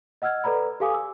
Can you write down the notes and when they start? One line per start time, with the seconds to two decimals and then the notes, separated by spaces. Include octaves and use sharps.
0.22 D#5 F#5 E6 F6 G#6
0.44 A4 B4 D5 A#5 B5
0.80 G4 A4 F5 G#5 D6 D#6
0.94 E6